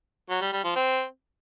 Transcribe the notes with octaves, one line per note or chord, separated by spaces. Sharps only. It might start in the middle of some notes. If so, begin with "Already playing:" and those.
F#3
G3
G3
F3
C4